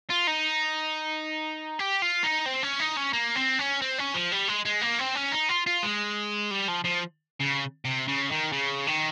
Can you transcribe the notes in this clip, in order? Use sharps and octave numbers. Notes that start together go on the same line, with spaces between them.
F4
D#4
G4
F4
D#4
C4
C#4
D#4
C#4
A#3
C4
C#4
C4
C#4
F3
G3
G#3
G#3
A#3
C4
C#4
D#4
F4
F4
G#3
G3
F3
F3
C#3
C3
C#3
D#3
C#3
D#3